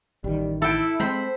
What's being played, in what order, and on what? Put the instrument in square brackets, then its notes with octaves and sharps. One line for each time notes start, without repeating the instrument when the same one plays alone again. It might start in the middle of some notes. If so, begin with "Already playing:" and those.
[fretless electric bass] A1 D#3 [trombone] G3
[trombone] E4 [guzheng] A4 G5
[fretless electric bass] G#3 [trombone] C4 [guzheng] C5 B5